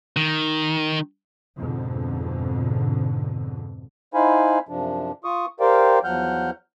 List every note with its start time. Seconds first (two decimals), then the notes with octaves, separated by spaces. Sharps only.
0.16 D#3
1.57 F2 G#2 B2 D3
4.14 D#4 E4 C5 F5 G#5 B5
4.69 F#2 C3 F3 D4
5.24 F4 C#6 D#6
5.60 G4 A#4 C5 D5 F5 G5
6.04 E2 F3 F#3 F#5 F6 G6